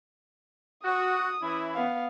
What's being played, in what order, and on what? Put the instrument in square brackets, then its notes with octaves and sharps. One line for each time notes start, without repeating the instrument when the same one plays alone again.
[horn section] F#4 [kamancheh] D#6
[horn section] E3 C#4 E4
[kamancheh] B3 F5